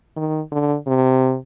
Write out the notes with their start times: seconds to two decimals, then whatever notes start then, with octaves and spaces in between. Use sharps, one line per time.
0.16 D#3
0.52 D3
0.87 C3